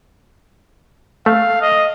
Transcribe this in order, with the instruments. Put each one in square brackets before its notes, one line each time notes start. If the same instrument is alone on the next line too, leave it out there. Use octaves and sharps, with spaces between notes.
[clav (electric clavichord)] A3 [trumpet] F5
[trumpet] D#5